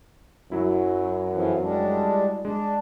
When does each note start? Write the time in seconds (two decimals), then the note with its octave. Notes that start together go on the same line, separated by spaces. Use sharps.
0.52 F#2 F#3 E4
1.33 F2 E3 F3
1.63 G3 G#3 D4
2.45 G#3 D4